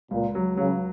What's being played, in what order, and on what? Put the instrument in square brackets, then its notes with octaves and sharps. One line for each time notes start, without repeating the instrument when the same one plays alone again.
[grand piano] C#2 [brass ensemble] A#2
[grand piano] F#3
[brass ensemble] C#3 [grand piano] F#3